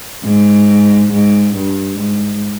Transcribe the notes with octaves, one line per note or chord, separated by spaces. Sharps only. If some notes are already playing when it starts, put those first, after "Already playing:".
G#2
G#2
G2
G#2